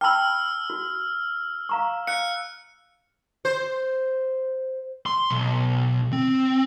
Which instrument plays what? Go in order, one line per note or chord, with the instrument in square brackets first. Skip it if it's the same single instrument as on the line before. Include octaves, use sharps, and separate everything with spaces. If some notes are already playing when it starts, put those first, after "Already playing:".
[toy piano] G5 A5 B5 [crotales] E6 F6
[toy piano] F#4
F5 A#5 C#6
[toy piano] F5 [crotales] F#6 C#7
[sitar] C5
[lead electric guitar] C6
B1
C4